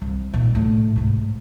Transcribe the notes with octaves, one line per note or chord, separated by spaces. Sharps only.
C2
A#2 D#3
A2 D3
G#2 C3